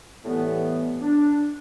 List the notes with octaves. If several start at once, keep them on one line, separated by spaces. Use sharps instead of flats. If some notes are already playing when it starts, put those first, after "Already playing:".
A2 E3 G3 B3
D4